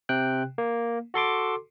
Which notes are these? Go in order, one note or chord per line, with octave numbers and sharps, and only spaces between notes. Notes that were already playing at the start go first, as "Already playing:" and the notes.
C3 G5 F#6
A#3
F#4 A4 C6 D6